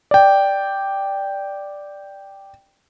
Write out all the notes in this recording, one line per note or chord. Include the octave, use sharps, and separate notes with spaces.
D5 G5